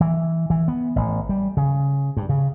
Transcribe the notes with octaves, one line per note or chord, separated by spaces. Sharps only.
E3
E3
B3
A1
G3
C#3
G2
C#3